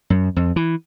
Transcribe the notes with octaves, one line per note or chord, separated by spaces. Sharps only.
F#2
F2
E3